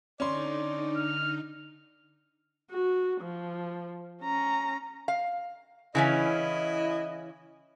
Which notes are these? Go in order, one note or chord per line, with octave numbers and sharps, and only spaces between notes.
D3 C#4 D#4 D5 C6
F6
F#4
F3
C#4 A#5
F5
C#3 E3 C#4 E4 D#5